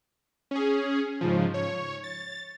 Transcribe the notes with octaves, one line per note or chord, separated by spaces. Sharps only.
C#4 G#4
G#2 C#3 F3
C#5
A6